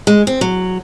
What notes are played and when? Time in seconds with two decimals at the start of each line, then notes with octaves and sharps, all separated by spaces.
0.07 G#3
0.27 C4
0.41 F#3